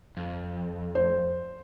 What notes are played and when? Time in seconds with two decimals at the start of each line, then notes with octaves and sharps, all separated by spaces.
0.17 F2
0.95 C5